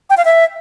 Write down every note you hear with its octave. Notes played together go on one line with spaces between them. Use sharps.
G5
F5
E5